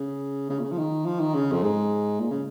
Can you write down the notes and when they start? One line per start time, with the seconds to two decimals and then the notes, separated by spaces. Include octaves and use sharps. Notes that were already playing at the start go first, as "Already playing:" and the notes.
Already playing: C#3
0.49 C#3
0.59 A#2
0.64 C#3
0.72 F3
0.78 D#3
1.06 F3
1.20 D#3
1.34 C#3
1.52 F2
1.63 G#2
2.19 A#2
2.31 C#3